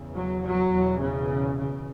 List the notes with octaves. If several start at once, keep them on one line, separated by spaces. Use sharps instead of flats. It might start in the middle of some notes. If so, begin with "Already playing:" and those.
Already playing: E2 C#3
F#3
F#3
E2 B2
C#3
C#3